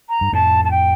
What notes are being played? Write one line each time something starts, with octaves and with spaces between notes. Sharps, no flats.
A#5
G2
F2 A2 A5
A5
G5